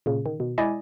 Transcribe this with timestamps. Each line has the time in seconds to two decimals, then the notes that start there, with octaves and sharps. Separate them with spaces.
0.06 A#2 C#3
0.26 D#3
0.40 B2
0.58 G#3 E4 D5 D#5 G#5